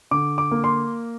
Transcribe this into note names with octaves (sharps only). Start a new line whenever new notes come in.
D3 D6
D6
A#3
C6